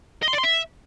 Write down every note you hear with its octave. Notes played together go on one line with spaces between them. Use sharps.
D#5
C6
D5
C6
E5